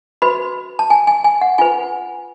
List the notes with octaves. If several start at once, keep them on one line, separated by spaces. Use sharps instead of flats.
F#4 B4 B5
A5
G#5
G#5
G#5
F#5
F4 B4 G#5